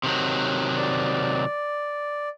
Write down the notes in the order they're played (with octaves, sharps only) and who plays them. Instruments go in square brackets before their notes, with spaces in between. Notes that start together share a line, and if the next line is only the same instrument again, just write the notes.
[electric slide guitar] C3 D#3 F#3
[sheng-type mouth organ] D5